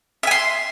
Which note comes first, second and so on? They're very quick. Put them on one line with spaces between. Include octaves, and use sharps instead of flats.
E5 G#5 C6